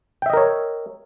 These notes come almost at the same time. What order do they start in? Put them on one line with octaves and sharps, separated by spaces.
G5 E5 D#5 A#4 C#5